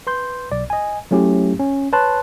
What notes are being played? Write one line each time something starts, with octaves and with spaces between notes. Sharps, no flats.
B4 C6 G6
B1 D5
D#5 G#5
F#3 A3 C#4 E4 G4
C#4
B4 C#5 A5 C6 F#6